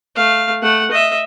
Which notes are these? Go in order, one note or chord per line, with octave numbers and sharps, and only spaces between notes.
A3 F5
A3 F#5
D#5 E5